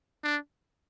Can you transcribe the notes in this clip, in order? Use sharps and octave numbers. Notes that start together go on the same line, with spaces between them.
D4